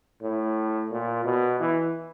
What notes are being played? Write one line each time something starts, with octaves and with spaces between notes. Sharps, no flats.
A2
A#2
B2
E3